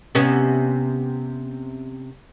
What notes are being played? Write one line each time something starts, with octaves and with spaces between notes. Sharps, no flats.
C3 B3 C#4